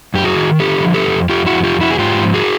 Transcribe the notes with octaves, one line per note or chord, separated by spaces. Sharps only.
F#2 G4
F#4 G#4
D#3
D3 G4 A4
F3
G4 A4
F2
F2 F4 G4
E4 F#4
F2
F4 G4
F2
E4 F#4
G#4
G#2 F4 G4
F3
F#4 G#4